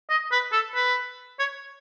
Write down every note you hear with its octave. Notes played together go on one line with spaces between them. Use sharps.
D#5
B4
A4
B4
C#5